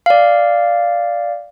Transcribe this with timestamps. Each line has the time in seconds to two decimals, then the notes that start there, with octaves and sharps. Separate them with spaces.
0.06 D5 F5